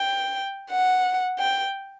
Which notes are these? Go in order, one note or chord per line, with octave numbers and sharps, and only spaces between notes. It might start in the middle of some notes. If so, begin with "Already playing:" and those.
Already playing: G5
F#5
G5